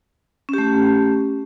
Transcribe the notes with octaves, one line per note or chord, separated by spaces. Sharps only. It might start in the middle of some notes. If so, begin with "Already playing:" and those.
A3 C#4 G4